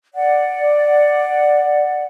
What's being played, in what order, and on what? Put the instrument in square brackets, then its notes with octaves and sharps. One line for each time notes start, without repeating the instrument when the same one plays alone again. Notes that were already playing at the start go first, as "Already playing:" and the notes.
[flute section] D5 F#5